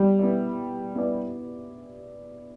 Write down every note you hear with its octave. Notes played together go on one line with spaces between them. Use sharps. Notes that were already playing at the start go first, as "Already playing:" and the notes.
Already playing: G3 B3 E4
B3 E4 B4 D5
B3 E4 B4 D5